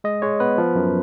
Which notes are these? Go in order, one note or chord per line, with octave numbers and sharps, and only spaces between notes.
G#3 D#5
G#3 C#5
B3 B4
F3
F#2